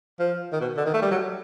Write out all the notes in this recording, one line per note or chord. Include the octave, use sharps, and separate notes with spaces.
F3
D#3
B2
D3
D#3
A3
G3
F#3